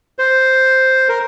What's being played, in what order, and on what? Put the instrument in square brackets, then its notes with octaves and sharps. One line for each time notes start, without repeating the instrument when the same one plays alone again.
[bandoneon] C5
A#4